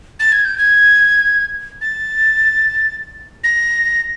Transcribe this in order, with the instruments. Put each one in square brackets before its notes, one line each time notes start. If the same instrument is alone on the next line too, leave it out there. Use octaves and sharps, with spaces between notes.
[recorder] A6
G#6
G6
G#6
A6
A#6